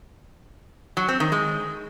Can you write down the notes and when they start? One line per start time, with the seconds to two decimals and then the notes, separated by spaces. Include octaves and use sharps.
0.97 F#3
1.09 C4
1.20 D#3
1.32 G#3